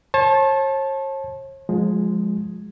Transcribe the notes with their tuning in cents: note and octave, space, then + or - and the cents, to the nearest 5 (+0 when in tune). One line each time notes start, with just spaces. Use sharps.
C#5 -45 A5 -15
F3 +35 G#3 +0